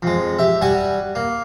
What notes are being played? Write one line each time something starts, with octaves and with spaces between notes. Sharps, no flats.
F2 G#3
G4 E5
G3 F#4 G#5 C#6
A#3